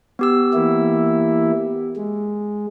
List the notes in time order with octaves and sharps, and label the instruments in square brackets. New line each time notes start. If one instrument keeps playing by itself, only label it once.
[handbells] B3 G4 E6
[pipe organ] E3 A#3 E4
G#3